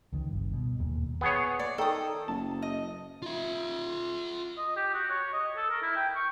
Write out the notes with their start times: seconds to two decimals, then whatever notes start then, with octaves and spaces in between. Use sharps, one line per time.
0.13 C#2 D#3
0.29 G1 G2
0.53 B2
0.79 E1 D#2 A#2
1.21 B3 G#4 C#5
1.59 D5
1.78 D#3 A4 G5 D#6
2.28 F#1 A5
2.62 D#5
3.22 F4 E5
4.57 D#5
4.76 G4
4.94 F#4
5.10 C#5
5.33 D#5
5.57 A4
5.70 A#4
5.82 E4
5.96 G5
6.15 C#6